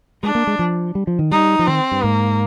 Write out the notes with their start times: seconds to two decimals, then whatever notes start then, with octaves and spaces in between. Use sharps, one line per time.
0.23 G#3 D4
0.35 A#3
0.47 G#3
0.59 F3
0.95 G3
1.07 F3
1.19 D#3
1.31 G3 D#4
1.59 F3
1.67 D#3 C4
1.91 G2
2.03 G#2 A#3